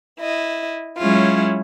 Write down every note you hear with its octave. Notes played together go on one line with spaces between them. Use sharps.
E4 D#5
F#3 G#3 C#4 E4 F4